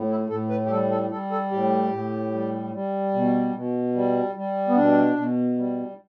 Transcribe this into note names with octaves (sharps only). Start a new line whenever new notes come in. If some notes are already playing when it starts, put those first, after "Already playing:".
Already playing: A2
E4
A2 A4
B4
G4
G3 A4
A4
G3 A4
A4
A2 G4
A2
G3
G3
B2
B2
G3
G3
B3
B2 D4
B2
G3